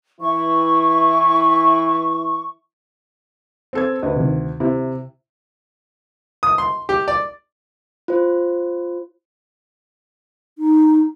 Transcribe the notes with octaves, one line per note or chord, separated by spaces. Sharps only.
E3 E4 C#6
C4 A4 G#6
D2 B4 D#5
C3 D#3
C3 E4 E5
D#6
C6
G4
D5
F4 C5
D#4